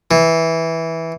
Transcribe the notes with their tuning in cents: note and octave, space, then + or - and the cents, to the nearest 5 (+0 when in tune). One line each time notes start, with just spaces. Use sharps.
E3 -10